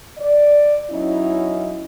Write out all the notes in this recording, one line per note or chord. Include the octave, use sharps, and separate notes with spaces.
D5
F#3 B3 C#4 D#4 E4